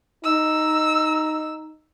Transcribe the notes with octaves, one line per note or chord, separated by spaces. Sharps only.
D#4 E6